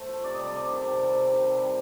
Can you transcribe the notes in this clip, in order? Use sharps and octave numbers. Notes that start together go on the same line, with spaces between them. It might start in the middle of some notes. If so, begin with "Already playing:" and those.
Already playing: A3 C5
F3
C3 D5
G3 D#5
D5
C3
D#3
C3
G3
C3
D#3
C3
G3